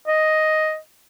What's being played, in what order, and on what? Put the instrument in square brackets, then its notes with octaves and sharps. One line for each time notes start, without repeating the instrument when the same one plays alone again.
[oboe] D#5